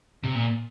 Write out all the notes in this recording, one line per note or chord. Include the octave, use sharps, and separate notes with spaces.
C3
A#2